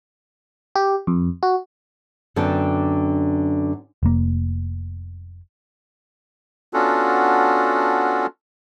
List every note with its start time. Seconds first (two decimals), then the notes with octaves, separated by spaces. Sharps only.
0.75 G4
1.07 F2
1.43 F#4
2.36 F#2 D3 B3 D4 G5 A5
4.03 F1 A#3
6.74 B3 C#4 D4 F4 F#4 A4